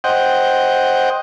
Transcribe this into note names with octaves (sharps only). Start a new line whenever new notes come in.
C5 D#5 F#5 G5